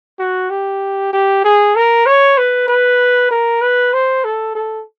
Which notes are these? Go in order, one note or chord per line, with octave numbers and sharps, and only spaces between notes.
F#4
G4
G4
G#4
A#4
C#5
B4
B4
A#4
B4
C5
A4
A4